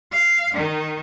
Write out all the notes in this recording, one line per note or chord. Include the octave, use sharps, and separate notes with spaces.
F5
D#3